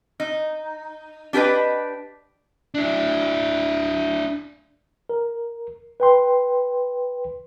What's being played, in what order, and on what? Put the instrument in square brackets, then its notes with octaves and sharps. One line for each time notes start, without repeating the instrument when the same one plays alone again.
[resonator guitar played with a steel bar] D#4
D4 G4 A4 B4 D#5
[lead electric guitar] D4 E4
[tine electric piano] A#4
B4 G5 C6